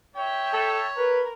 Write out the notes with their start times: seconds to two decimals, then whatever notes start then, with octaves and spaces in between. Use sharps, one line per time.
0.16 C#5 E5 G5
0.53 A4
0.97 A#4 B4